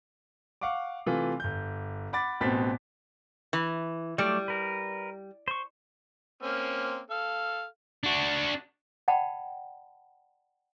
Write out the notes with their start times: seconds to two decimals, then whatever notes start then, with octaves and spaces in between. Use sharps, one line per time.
0.61 F5 F#5 C#6 D6
1.06 C3 E3 A3 F4
1.40 G1 G6
2.13 F#5 B5 D6 A6
2.41 A1 B2 C4 A6 B6
3.53 E3
4.18 F#3 G3 A3 D5
4.48 A#4 B4
5.48 C5 C#6
6.43 A#3 C4 C#4
7.10 A4 F5
8.03 D4 F#4
9.08 D5 F#5 G5 A5 B5